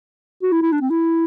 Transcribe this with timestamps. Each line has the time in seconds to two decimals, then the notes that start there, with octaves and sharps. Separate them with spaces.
0.43 F#4
0.52 E4
0.62 E4
0.72 D4
0.81 C4
0.90 E4